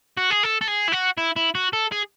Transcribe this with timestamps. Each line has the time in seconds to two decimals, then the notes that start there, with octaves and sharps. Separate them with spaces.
0.17 F#4
0.30 G#4
0.43 A4
0.61 A4
0.68 G#4
0.88 E4
0.93 F#4
1.18 E4
1.36 E4
1.55 F#4
1.73 A4
1.92 G#4